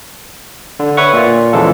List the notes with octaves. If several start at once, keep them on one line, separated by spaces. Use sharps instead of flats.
D3
B4 C#5 E5 F#5 C#6
A#2 F4
E2 C#3 E3 F3 G#3 A4